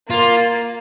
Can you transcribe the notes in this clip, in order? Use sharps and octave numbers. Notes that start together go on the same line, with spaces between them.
A#3 F4